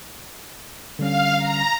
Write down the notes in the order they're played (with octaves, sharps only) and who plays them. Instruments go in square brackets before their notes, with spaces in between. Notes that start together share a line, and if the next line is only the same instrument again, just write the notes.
[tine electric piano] D3 G3 C#4 [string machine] F5
[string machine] A#5